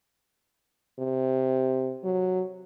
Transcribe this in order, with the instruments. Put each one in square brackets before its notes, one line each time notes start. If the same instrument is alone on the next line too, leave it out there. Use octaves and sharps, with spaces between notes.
[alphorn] C3
F#3